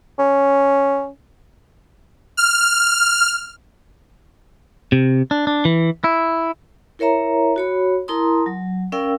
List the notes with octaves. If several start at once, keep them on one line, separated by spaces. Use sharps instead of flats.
C#4
F6
C3
D4
D4
E3
E4
E4 A#4 C#5 E5 A#5
F#4 C#5 B5
E4 A#4 A5 A#5 C6 D#6
F#3
C#4 A#4 D5 F5 G5 E6